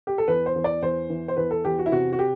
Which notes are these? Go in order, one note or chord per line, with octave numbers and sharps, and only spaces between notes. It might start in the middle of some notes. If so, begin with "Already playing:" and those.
G4
A4
E2 B4
C5
E2
D5
E2 C5
E3
C5
E2 B4
A4
E2 G4
F#4
E4
C3 F#4
F#4
G4